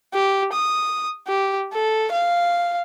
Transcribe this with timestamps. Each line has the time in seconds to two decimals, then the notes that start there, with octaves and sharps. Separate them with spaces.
0.14 G4
0.53 D#6
1.28 G4
1.73 A4
2.12 F5